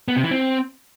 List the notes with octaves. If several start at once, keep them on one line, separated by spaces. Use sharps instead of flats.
B3
C3
E3
C4